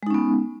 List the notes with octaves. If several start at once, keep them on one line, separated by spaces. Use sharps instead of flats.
G#3 B3 C#4 D#4